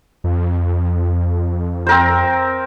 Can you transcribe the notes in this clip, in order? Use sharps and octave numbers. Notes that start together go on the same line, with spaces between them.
F2
C4 A#4 C5